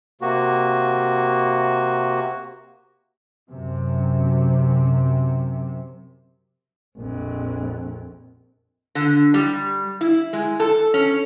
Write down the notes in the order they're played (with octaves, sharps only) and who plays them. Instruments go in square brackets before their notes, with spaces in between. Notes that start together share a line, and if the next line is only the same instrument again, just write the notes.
[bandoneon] C3 A#3 F#4
[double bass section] F#2 C3
[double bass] A#1 F2
[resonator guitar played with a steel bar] D3
G3
E4
G#3
A4
C#4